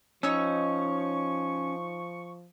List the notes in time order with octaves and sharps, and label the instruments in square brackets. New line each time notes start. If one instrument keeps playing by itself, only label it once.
[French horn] F3 [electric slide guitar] C#4 [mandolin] D#4 C#5 E6 [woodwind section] C#6